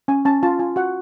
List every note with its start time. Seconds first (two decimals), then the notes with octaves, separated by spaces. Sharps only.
0.08 C#4 G#5
0.25 C#4 A5
0.43 F4 A5
0.59 F4 G#5
0.76 F#4 F#5